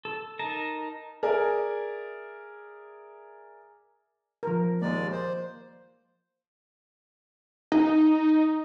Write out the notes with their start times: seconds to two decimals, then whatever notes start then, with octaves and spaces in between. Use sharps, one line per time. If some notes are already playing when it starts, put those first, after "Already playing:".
0.05 A4
0.39 D#4 A#4 A5 A#5
1.23 G#4 A#4 D5 E5 G#5
4.43 F3 A#4
4.82 D#2 G#3 A#3 D5
5.12 C5
7.72 D#4